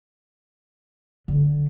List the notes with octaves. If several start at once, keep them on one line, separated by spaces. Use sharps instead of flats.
D3